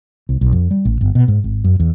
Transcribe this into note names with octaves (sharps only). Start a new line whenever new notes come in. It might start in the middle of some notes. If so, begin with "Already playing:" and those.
C2
B1
F2
G3
A1
G1
B2
G#2
G#1
F#2
E2